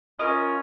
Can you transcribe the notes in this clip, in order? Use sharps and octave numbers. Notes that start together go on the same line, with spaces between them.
C#4 F4 A#4 D#5